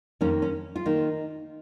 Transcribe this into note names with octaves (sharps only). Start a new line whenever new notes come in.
F2 D#3 A#3 C#4
C#4
F4
D#3 A#3 D#4